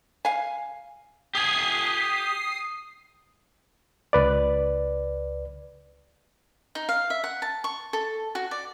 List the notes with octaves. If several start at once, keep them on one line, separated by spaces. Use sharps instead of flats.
F5 G#5
G4 G#5 D#6 C7
C#2 B4 D5
D#4
F5
E5
F#5
A5
C#6
A4
F#4
D5